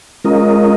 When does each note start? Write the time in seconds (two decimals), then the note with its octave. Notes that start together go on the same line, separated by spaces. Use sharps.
0.24 G#3 C#4 F4 A#4 D#5